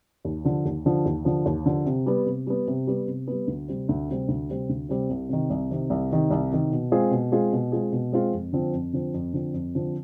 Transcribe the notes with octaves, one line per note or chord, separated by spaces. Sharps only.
D#2
D3 F3
D#2
D3 F3
D#2
D3 F3
D#2
D3 F3
C3
G3 B3
C3
G3 B3
C3
G3 B3
C3
G3 B3
D2
C3 G3 C4
D2
C3 G3 C4
D2
C3 G3 C4
D2
C3 G3 C4
C2
C3 D#3
C2
C3 D#3
C2
C3 D#3
C2
C3 D#3
B2
G#3 C4 F4 G#4
B2
G#3 C4 F4 G#4
B2
G#3 C4 F4 G#4
B2
G#3 C4 F4 G#4
F2
D3 F3 C4
F2
D3 F3 C4
F2
D3 F3 C4
F2
D3 F3 C4